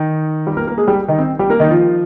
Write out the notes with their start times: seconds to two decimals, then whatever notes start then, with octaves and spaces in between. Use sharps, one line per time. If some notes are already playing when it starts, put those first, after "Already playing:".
Already playing: D#3 D#4
0.47 G3 G4
0.57 A#3 A#4
0.67 A#3 A#4
0.78 G#3 G#4
0.88 G3 G4
1.08 D#3 D#4
1.18 C4
1.39 G3 G4
1.50 A#3 A#4
1.60 D#3 D#4
1.70 F3 F4